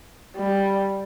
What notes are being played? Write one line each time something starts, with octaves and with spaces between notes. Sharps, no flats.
G3